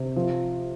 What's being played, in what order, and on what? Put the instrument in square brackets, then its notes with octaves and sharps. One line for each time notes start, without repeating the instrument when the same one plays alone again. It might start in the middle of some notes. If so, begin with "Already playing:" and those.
Already playing: [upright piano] C3
F3